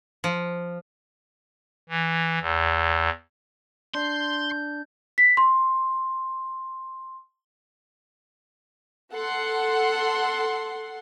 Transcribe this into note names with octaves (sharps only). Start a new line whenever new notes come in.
F3
E3
E2
D4 C6 G6
B6
C6
A4 F#5 C6